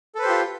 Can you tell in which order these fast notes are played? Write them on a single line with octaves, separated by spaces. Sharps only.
A4 B4 C5 G4 F4